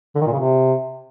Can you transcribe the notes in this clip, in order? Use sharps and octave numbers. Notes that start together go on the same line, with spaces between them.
D3
D#3
A#2
C#3
C3